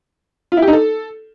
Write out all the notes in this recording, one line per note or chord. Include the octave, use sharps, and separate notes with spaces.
F4
E4
G4
D#4
A4